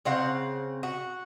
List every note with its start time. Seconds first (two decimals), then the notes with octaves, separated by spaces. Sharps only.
0.05 C#3 C4 F5 F#5
0.83 F#4